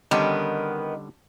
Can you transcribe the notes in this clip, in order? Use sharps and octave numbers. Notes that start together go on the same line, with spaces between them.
D3 D#3 G3 B3 C#4